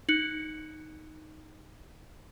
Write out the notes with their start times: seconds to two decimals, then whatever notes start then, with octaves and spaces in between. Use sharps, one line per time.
0.09 D#4 F#6 C#7 F#7